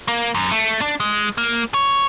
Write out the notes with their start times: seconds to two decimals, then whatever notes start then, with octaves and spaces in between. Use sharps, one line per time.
0.08 A#3
0.35 F#2
0.51 A3
0.81 D4
1.00 G#3
1.38 A#3
1.74 C#5